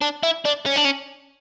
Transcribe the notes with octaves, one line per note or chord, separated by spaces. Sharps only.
D4
E4
D4
C#4
D4
C#4